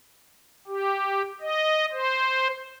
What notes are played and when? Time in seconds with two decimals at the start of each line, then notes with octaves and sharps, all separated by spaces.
0.67 G4
1.41 D#5
1.92 C5